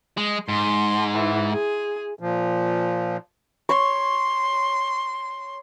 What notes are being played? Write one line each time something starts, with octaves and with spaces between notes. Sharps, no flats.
G#3
G#2 C6
E3
G#4
A#2 F3
C#5 C6 C#6